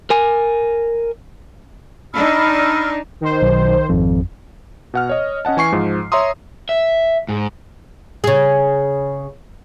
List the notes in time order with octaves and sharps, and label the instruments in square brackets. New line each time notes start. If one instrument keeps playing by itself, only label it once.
[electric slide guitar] A#4 G#5
[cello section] D4 D#4 [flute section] B5 E6 F6
[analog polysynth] D#3 C5
[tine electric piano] B1
G#1 F2
[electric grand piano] B2 F#5 F6
C#5 D#5
C#4 D#5 F#5 A5
E3 G#5 C#6 C7
G#2 F3
C#5 E5 A#5 C6 D#6
[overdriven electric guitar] E5
G#2
[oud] C#3 G#4